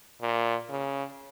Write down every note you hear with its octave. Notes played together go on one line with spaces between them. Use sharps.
A#2
C#3